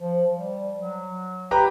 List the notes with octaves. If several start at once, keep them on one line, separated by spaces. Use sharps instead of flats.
F3
G3
F#3
G4 B4 A#5